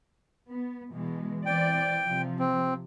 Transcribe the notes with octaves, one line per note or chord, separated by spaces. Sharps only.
B3
B2 E3 G#3
E3 C4 D5 G5
C3 F3
C4